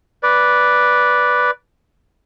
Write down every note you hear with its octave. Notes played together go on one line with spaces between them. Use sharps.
B4 D5